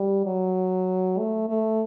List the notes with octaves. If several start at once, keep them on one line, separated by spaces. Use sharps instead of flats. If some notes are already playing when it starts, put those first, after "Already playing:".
Already playing: G3
F#3
A3
A3